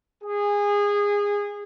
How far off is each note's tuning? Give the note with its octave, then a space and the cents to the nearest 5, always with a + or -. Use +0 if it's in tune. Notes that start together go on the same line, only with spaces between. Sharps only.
G#4 -20